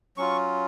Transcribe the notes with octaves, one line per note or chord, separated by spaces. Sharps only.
F#3 C#4 F4 C#6